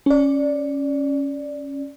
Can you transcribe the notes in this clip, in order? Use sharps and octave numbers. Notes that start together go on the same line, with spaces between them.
C#4 D5